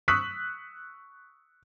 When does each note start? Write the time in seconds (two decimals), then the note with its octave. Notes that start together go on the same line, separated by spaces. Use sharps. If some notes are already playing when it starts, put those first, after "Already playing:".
0.08 C#6 D#6 E6 F#6 B6